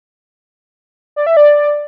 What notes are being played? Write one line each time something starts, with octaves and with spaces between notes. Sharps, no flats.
D5
E5
D5